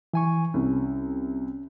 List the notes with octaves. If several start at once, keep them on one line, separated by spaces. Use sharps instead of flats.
E3 G#5 C#6
C2 C#4